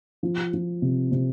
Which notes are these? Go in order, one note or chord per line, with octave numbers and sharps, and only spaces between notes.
F3
F3
C3
C3